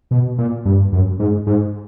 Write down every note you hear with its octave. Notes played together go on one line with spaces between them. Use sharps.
B2
A#2
G2
F#2
G#2
G#2